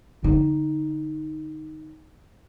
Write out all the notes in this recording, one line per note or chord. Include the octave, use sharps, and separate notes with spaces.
D3 D#4